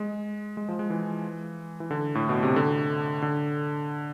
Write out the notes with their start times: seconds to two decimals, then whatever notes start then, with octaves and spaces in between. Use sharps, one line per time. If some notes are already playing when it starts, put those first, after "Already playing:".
Already playing: G#3
0.57 G#3
0.69 F3
0.79 G#3
0.90 E3
1.80 E3
1.91 D3
2.15 A2
2.29 B2
2.43 C3
2.56 D3
3.22 D3